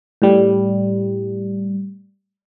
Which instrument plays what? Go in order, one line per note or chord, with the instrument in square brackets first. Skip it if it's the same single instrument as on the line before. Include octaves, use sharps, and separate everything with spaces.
[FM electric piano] A2 G3